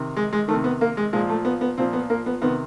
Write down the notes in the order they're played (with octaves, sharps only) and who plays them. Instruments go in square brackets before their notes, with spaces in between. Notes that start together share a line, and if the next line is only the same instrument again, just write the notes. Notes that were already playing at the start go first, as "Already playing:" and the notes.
Already playing: [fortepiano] C3 D#3
G#3
G#3
D#3 A3
C3
B3
A#3
G#3
A#2 F3 G#3
A3
B3
B3
A#2 F3 C4
B3
A#3
B3
C3 D#3 B3